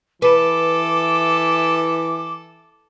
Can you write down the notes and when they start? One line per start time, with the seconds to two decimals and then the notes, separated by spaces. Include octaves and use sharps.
0.22 E3 A4 B4 D6